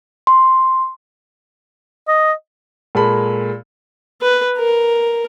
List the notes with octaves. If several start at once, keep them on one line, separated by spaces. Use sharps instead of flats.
C6
D#5
A#2 G#3 A4 B5
B4
A#4